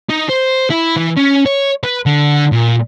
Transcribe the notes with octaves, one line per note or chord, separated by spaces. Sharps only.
D#4
C5
E4
E3
C#4
C#5
B4
D3
A#2